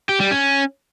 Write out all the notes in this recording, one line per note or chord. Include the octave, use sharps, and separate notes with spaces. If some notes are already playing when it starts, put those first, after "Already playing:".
G4
G3
C#4